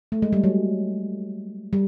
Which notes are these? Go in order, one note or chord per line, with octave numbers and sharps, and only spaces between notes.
A3
G#3
G3
F#3
G3